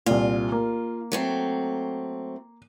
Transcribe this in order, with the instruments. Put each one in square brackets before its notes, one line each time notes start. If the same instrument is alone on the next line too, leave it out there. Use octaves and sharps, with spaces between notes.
[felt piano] C2 A#2 [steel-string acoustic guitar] F4
[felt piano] A#3
[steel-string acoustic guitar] F#3 A3 C4